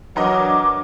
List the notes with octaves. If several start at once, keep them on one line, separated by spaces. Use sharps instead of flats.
E3 F#3 D4 A#4 D#5 D6